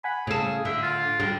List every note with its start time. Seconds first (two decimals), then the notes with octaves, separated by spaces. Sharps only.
0.04 F#5 G#5 B5
0.27 A2 C#3 G#4 A4
0.65 D3 E5
0.82 F4
1.20 D3 G3